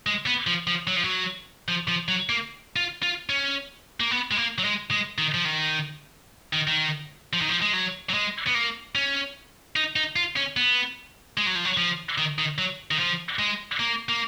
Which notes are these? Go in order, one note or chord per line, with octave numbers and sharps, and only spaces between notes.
G#3
B3
F3
F3
F#3
F3
F#3
F3
F3
F#3
A#3
F4
F4
C#4
A#3
B3
G#3
A#3
F#3
G#3
G#3
D#3
F3
D#3
D#3
D#3
F3
D#3
F3
G#3
F#3
F#3
G#3
B3
A#3
C#4
D#4
D#4
F4
C#4
B3
G#3
F#3
F3
F#3
F3
D#3
D#3
F#3
D#3
F3
G#3
A#3
A#3